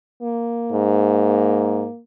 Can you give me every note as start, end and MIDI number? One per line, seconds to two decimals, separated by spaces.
0.23 2.00 58
0.72 1.85 44